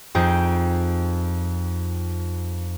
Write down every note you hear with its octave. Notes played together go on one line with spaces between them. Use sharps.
F2 D#4 G#4 G5